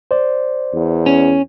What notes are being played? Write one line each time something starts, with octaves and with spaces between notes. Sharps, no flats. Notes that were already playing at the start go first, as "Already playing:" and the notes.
C5 D5
E2
C#4